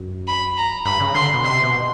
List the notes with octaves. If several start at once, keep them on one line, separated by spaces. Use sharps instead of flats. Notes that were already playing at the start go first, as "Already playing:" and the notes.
Already playing: F#2
B5
A#5
G2 B5
C#3
D3 C6
B2
C3 C6
B2